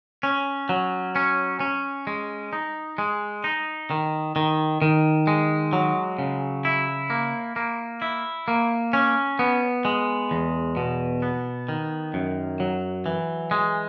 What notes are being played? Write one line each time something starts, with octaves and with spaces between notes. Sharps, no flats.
C#4
F#3
C#4
C#4
G#3
D#4
G#3
D#4
D#3
D#3
D#3
G#3
F#3
C#3
E4
A#3
A#3
E4
A#3
C#4
B3
G#3
E2
B2
B3
D#3
F#2
F#3
E3
G#3